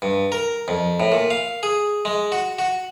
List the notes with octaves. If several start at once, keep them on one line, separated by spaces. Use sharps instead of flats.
G2
A#4
F2
A2
A#2
F5
G#4
G#3
F#4
F#4